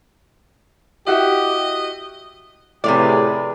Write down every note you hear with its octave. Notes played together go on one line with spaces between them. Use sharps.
E4 F#4 G4 D#5 E5
A2 C3 F3 G4 G#4 B4 D5